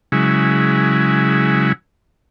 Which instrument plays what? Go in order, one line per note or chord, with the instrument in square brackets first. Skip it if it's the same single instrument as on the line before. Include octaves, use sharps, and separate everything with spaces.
[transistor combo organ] C#3 F#3 G#3 E4